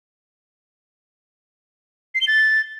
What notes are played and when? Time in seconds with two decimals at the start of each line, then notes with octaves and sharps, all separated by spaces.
2.15 C7
2.21 G7
2.28 A6